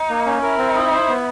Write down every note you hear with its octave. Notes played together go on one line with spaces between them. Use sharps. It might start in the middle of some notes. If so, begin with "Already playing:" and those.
Already playing: D#4
A#3
C#4
E4 A#4
C4
D#4
C5
B3